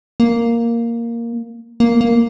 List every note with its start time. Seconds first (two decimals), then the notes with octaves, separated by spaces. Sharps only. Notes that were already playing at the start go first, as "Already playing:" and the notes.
0.20 A#3
1.80 A#3
2.01 A#3